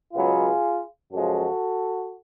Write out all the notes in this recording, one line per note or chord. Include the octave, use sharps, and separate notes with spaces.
C#2 B2 F#3 B3 F4 G#4
F#2 C#3 F3 G#3 F#4 A4